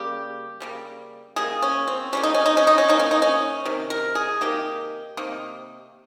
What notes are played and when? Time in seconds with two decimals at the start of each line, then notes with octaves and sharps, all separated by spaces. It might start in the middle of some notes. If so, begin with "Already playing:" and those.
Already playing: C#3 G3 A#3 G4
0.60 C#3 G3 A#3
1.36 C#3 G3 A#3 G#4
1.62 C#4
1.87 C4
2.13 C#3 G3 A#3 C#4
2.23 D#4
2.34 C#4
2.46 D#4
2.57 C#4
2.67 D#4
2.78 C#4
2.88 C3 D#3 A#3 D#4
2.99 C#4
3.11 D#4
3.22 C#4
3.65 C3 D#3
3.90 A#4
4.15 G#4
4.41 C3 D#3 A#3 G4
5.17 C3 D#3 A#3